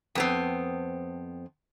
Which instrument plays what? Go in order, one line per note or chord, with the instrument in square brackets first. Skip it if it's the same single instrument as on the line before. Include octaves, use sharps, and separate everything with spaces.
[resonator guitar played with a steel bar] F2 B3 C4